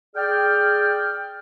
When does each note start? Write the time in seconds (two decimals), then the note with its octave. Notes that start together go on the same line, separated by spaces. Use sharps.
0.15 G#4 D5 G5 F6